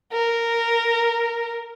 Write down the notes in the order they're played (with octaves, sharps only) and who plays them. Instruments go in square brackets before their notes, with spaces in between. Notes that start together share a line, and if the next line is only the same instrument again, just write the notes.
[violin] A#4